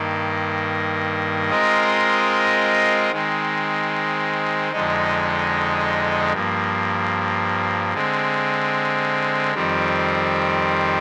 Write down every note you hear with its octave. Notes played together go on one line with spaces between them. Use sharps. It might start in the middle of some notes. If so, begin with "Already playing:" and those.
Already playing: G2 D#3 A#3
G#3 C4 F4 A#4 D#5
D#3 G#3 C4
F2 D3 G#3 D#4
G2 F3 A#3
D3 G#3 C4
F2 D#3 G3 C4